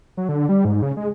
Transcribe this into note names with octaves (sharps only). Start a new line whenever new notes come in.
F#3
D3
G3
G#2
C#3
G#3